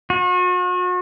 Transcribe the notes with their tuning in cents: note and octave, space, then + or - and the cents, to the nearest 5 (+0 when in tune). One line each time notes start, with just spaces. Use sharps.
F#4 -40